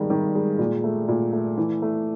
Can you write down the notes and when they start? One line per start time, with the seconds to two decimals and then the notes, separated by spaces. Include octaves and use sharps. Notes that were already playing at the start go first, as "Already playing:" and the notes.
Already playing: G2 D#3 G#3
0.10 D#3
0.35 G#3
0.59 A#2
0.84 A3
1.08 A#2
1.33 A3
1.57 E3
1.82 A3